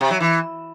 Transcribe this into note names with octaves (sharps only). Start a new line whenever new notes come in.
C3
F#3
E3